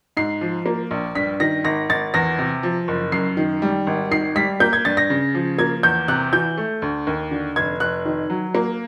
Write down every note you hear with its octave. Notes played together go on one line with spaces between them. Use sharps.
G#2 C7
F3
A#3
A#1
G2 B6
D#3 A#6
G#1 A#6
G#1 A6
E2 A#6
C3
F3
F#1
F#2 C7
D#3
G3
G#1
D#3 C7
G3 B6
A#3 G6
G#6
G2 A6
A#6
C#3
F3
A#3 G#6
E2 G6
C3 F#6
E3 G6
A3
D2
D#2
D3
F1 G#6
F1 F#6
D#3
F#3
A#3